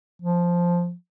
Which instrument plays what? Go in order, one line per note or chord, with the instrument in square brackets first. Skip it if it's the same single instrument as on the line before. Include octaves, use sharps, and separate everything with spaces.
[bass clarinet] F3